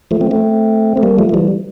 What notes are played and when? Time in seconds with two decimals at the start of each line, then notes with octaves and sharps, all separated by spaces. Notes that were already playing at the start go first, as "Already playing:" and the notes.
0.11 F3 A3
0.21 A3 C4
0.31 A3 C4
0.97 A3
1.03 G3 A#3
1.19 F3 A3
1.29 A3
1.34 E3 G3